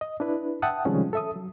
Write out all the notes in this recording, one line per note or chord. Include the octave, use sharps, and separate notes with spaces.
D#5
D4 E4 B4
E5 F#5 G5 A5 D#6
C3 D#3 F3 G3 G#3 C#4
A4 E5 D#6
F#3